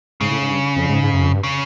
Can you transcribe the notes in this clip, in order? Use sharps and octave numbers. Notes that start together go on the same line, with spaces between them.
G#2 C#3
A2
G#2
G2
F2
G#2
G#2
F#2
F2
F#2
G2
C#3